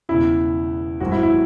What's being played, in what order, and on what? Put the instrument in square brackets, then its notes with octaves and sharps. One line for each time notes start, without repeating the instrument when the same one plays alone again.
[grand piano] E1 E2 C#3 [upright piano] E4
[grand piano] G#1 G#2 F#3 [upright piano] F#4
[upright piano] E4
E4